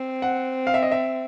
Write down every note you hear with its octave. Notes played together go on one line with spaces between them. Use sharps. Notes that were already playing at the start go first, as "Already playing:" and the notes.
Already playing: C4
F#5
F5
E5
D#5
E5